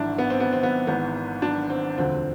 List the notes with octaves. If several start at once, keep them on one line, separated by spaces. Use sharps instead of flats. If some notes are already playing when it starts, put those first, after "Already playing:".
Already playing: G#1 G#2 E3 D4 E4
B3
C4
B3
C4
B3
G#1 G#2 E3 B3
D4
C4
E1 D2 D3 F3 C4